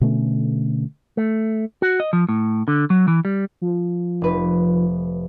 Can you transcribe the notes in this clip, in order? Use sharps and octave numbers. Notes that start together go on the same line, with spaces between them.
B2 D3 A3 C#4
A3
F#4
D#5
F3
A2
D3
F#3
E3
G3
F3
F1 B4